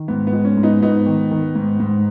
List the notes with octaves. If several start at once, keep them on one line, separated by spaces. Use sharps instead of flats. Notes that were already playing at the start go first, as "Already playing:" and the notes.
Already playing: D#3
G#2 B3
B3
G#3
C#4
G#2
B3 D#4
G#2 B3 D#4
D#3
D#3
G#2
G#2